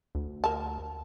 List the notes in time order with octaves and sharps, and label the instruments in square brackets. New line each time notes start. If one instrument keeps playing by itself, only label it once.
[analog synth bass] D2
[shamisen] A#4 A5